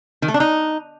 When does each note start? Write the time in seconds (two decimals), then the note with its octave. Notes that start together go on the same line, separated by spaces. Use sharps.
0.22 D#3
0.28 A3
0.34 D4
0.40 D#4